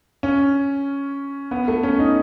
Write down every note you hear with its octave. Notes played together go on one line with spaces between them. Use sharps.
C#4
B3
A3
C#4
D#4